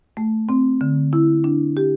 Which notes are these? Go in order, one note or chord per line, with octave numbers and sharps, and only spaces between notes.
A3
C4
D3
E4
D4
G4